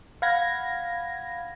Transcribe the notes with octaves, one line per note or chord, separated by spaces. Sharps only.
F5 F#5 B5 G#6 A#6